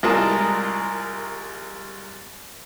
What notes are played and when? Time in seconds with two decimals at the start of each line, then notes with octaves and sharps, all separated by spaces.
0.03 C2 G#3 F4 A#4 A5 D#6